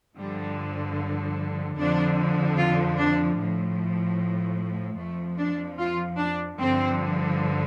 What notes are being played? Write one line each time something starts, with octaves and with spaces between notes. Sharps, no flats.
G2 D3 F3 G3
F2 D3 F3 D4
F4
D4
A2 F3
F2 F3 A3
D4
F4
D4
G2 D3 F3 C4